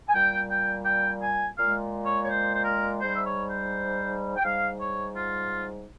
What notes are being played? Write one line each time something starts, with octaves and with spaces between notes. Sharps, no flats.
G#5
A#2 G3 G5
G5
G5
G#5
A#2 G#3 F5
C#5
C#5
C5
C5
A#4
G#2 G3 C5
E5
C#5
C5
G5
G#2 G3 F5
C#5
F4